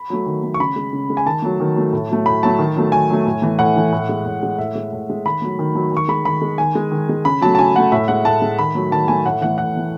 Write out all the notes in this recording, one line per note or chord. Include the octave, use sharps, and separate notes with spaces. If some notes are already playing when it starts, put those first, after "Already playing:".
Already playing: B5
F#3 A3
D#3
F#3 A3
C#6
C#3 B5
G#3
C#3
G#3
G#5
D#3 A5
F#3 A3
D#3
F#3 A3
A2
F#3 A3
A2 B5
F#3 A3 A5
D#3
F#3 A3
D#3 G#5
F#3 A3
A2
E3 A3
A2 F#5
E3 A3
A2
G#3
A2
G#3
A2 E5
G#3
A2
G#3
D#3 B5
F#3 A3
D#3
F#3 A3
D#3 C#6
G#3 B5
D#3 B5
G#3
D#3 G#5
G#3
D#3
G#3
C#3 B5
F#3 A3 A5
A5
C#3 G#5
F#3 A3 F#5
A2 E5
G#3 F#5
A2 A5
G#3
D#3 B5
F#3 A3
D#3 A5
F#3 A3 G#5
A2 F#5
E3 A3 F#5
A2 F#5
E3 A3